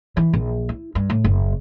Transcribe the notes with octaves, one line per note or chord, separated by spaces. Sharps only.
E3
A#1
E4
G2
A2
F#1